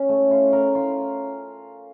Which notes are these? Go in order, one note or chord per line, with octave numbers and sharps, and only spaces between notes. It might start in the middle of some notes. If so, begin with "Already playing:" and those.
Already playing: C#4
A3
F4
A#4
F4